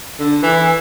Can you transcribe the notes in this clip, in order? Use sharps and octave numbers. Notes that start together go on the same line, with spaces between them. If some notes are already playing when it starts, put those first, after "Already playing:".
D3
E3